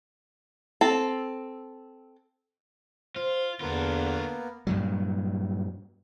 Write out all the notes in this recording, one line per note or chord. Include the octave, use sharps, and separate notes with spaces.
C4 A4
F4 C5
E2 D3 A#3 B3 D4 F4
G2 A#2 F#3